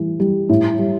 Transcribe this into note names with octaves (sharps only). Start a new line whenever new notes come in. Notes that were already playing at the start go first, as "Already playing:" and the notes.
Already playing: A2 E3 G3
G3
A2
G3